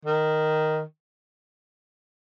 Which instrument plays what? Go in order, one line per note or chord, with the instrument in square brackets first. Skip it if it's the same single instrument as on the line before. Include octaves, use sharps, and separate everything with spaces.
[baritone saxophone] D#3